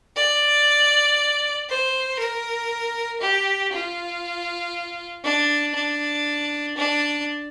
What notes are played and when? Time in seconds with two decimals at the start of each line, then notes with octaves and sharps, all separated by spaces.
0.16 D5
1.69 C5
2.19 A#4
3.21 G4
3.72 F4
5.24 D4
5.75 D4
6.77 D4